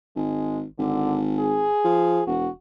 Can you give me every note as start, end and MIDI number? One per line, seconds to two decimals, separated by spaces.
0.16 0.65 32
0.16 0.58 56
0.79 1.69 32
0.79 1.17 50
1.39 2.23 68
1.85 2.22 53
2.27 2.48 28
2.27 2.49 66